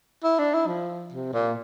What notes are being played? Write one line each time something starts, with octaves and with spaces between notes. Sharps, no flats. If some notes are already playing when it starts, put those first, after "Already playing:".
E4
D4
E4
F3
C3
A#2